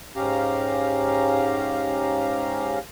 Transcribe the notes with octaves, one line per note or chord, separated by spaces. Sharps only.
G#2 C#4 G4 F5 A#5